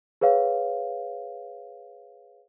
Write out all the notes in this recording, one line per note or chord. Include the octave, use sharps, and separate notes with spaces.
G#4 B4 C#5 F5